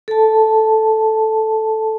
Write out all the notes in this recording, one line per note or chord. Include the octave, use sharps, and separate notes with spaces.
A4 A5